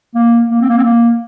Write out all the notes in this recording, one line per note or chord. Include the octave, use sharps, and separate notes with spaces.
A#3
A#3
C4
A#3
C4
A#3